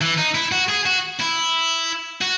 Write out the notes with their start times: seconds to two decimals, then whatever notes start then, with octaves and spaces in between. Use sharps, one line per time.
0.01 E3
0.18 D#4
0.35 E4
0.52 F#4
0.69 G#4
0.85 F#4
1.20 E4
2.21 F#4